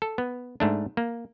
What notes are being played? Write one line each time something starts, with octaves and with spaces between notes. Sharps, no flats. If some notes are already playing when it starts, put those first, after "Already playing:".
A4
B3
G#2 A3 D4
A#3